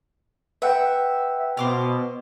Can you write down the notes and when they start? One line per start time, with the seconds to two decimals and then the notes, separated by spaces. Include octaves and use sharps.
0.62 B4 E5 F#5 G5
1.57 B2 C5 D6 F6